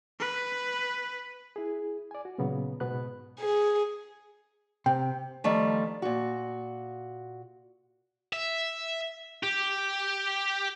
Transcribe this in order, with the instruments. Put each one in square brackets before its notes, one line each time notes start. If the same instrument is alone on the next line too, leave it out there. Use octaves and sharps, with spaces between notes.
[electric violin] B4
[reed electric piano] E4 G#4
D5 G#5
F#4
A#2 C#3 F#3 B3
G#2 B2 B3 B5 F#6
[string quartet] G#4
[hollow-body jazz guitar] C3 [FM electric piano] G5
[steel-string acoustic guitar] D#3 F3 G3 A3
A#2 F#4
[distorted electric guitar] E5
G4